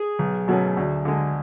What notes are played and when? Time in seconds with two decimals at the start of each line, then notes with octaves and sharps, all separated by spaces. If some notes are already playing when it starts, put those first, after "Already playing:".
Already playing: G#4
0.19 B1
0.48 B2 F#3 A3 C#4
0.77 D2
1.05 D3 G#3